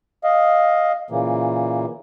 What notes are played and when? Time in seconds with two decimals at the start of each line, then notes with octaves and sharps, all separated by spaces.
0.24 D#5 F5
1.10 A#2 C#3 E3 A#3